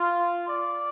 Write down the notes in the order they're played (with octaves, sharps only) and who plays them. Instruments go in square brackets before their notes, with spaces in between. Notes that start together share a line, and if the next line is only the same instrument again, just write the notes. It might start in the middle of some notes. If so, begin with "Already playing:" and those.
Already playing: [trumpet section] F4
D5